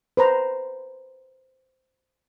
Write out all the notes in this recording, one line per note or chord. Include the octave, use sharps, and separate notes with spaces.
B4 C5 A#5